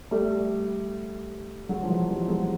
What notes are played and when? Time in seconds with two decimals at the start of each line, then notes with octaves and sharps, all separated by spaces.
0.11 G3 A3
1.69 F#3 G#3
1.83 F3
1.89 E3 F#3
2.09 F3 G3
2.28 F#3 G#3